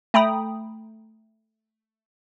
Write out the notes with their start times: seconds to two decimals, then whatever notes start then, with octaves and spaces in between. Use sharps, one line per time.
0.14 A3 G5 A#5 B5 D#6